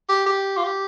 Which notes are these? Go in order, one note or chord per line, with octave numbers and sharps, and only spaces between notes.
G4
G4
F4
G4